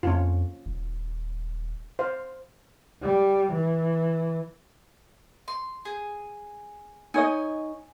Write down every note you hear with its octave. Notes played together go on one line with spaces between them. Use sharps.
F2 C#4 F4
D#1
C5 F5
G3
E3
C6
G#4
D#4 C#5 D#5 G#5